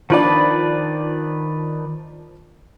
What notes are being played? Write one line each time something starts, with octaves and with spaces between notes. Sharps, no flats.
D#3 F3 D4 B4 D5